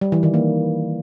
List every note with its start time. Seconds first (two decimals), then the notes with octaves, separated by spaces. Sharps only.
0.01 G3
0.12 E3
0.23 D#3
0.34 A#3